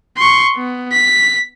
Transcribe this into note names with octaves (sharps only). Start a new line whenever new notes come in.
C6 C#6
B3
B6